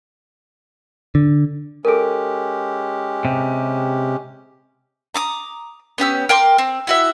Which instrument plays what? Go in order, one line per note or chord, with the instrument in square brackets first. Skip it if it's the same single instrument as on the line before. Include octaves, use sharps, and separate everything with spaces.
[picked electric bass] D3
[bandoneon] G#3 C#4 G4 [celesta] A4 A#4
[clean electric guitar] C3
[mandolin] A#5 D6 D#6
B3 C#4 G4 E6
A#4 G5 C6 D6
C4
E4 F#4 E5